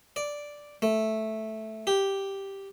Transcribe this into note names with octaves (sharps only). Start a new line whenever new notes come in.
D5
A3
G4